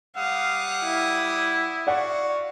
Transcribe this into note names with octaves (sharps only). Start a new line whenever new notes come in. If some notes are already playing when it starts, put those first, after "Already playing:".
G3 G4 F5 F#5 D#6
E4
F#4 D5 F5 F#5 C#6